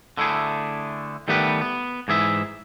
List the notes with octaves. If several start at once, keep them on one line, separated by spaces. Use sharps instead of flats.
D3 A3 E4 G#4
D#3 G3 A3 B3 G4 B4
B3
G#2 E3 G#4 E5